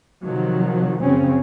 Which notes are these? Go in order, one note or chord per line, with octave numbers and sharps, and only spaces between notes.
C3 D#3 F3 F#3
F#2 C#3 F3 C4 C#4